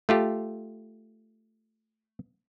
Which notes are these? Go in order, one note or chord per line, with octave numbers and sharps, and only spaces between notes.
A3 F4 G4